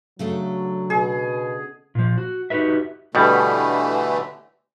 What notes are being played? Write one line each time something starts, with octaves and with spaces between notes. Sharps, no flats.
C#3 F#3 A3 D4
B2 G#4
A#2 F3
F#4
D#4 F#4 G4 B4 E5
B2 D3 E3 G3 A3